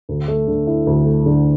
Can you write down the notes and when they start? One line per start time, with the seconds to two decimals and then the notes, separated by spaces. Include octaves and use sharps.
0.09 D2
0.28 A3
0.48 D3
0.67 E4
0.87 D2
1.06 A3
1.26 D3